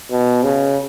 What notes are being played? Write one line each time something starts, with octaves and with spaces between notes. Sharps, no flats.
B2
C#3